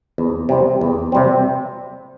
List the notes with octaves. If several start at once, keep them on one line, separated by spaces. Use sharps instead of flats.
E2
C3 G3 C4
E2
C3 G3 C4